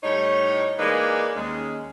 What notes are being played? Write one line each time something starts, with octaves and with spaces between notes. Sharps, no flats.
A2 G3 D#4 C#5
E3 G#3 A#3 D#4 B4 D5
D#2 G#3 C#4